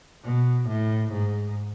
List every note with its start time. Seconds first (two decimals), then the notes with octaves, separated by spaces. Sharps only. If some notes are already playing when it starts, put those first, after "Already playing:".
0.24 B2
0.68 A2
1.12 G#2